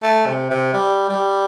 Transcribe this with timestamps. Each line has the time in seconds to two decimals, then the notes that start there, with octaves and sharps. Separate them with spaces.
0.02 A3
0.26 C3
0.50 C3
0.73 G3
1.09 G3